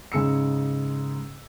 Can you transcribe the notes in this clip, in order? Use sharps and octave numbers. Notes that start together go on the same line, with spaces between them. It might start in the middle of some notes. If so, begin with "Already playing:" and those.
G#2 C#3 G#4 E6 C#7